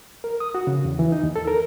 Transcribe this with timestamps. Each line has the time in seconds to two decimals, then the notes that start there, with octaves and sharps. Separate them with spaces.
0.24 A#4
0.40 D#6
0.55 F#4
0.67 C#3
0.85 E2
0.99 E3
1.12 D#4
1.23 D#2
1.36 A4
1.48 A#4